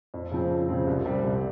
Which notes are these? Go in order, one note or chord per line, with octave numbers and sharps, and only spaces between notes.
F2
C#3 F3 C4
F2
C#3 F3 C4
C2
C3 G3 C4
C2